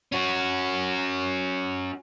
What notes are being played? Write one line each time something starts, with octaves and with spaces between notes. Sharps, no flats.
C#4 F#4